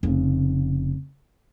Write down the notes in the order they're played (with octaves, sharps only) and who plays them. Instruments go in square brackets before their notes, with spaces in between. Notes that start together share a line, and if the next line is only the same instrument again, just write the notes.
[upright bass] F1 C#3